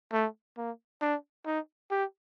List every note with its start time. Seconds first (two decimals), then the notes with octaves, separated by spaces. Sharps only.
0.13 A3
0.57 A#3
1.02 D4
1.46 D#4
1.91 G4